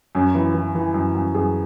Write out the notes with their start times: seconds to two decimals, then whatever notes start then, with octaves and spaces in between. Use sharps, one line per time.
0.15 F#2 C#4
0.35 E3
0.55 E3
0.75 E3
0.94 F#2
1.14 F#2
1.34 F#2 G#4